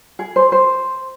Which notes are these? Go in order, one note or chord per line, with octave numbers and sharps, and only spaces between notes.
G#4
C5
C5